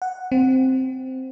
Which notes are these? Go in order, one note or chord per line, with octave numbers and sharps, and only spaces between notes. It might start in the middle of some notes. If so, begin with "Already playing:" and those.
F#5
C4